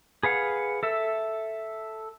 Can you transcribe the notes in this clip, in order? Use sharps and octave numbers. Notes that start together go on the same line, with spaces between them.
G#4 B4 F5 F#5
A4 E5